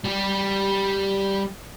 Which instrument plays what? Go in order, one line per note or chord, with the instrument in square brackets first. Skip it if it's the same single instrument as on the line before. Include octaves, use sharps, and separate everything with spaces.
[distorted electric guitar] G3 G4